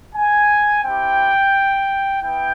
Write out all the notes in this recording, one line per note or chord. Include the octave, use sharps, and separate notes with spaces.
G#5
C4 E4 G4 G5
B3 E4 G5